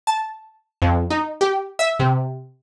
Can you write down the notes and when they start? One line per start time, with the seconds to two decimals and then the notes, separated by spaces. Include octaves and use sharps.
0.07 A5
0.82 F2
1.10 D#4
1.41 G4
1.79 E5
1.99 C3